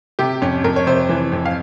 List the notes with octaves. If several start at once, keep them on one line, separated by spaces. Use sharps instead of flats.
C3 G4
F2 C#4
F2 A#4
C#5
C3 C5
E3
F2
F5